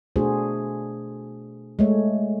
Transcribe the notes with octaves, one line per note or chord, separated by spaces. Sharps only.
B2 A3 D4 F#4 G#4 C5
G#3 A3 C#5